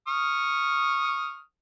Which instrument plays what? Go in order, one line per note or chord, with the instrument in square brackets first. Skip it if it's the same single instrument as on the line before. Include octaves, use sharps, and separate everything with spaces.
[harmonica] C#6 D#6 F6